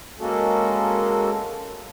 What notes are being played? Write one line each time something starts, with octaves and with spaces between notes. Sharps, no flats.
G#3 A#3 C#4 F#4 A4